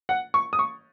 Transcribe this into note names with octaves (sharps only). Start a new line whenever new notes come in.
F#5
C#6
D#6
C#6